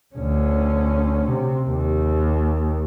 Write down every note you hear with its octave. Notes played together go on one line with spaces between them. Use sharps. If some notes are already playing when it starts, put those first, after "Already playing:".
D2 C#4
C3
D#2